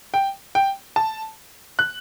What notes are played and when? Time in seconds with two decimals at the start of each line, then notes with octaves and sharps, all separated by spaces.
0.14 G5
0.55 G5
0.96 A5
1.79 F#6